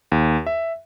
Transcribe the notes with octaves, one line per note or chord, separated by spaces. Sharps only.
D#2
E5